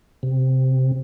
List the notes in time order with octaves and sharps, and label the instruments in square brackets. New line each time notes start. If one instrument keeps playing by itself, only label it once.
[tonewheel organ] C3